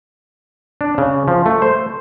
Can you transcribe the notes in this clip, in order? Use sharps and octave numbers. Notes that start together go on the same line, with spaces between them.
D4
C#3
F3
A3
C5